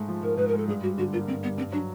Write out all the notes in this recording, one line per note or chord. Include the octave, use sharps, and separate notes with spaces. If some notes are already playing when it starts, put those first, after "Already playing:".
Already playing: G#2 G#3 A3
F3
G#2 A#4
G#2 B4
A#4
G#3 A4
G2 G#4
G3 F#4
D3 F#4
A#3 F4
G2 C4
G3 B3
G2 C4
F#3 D4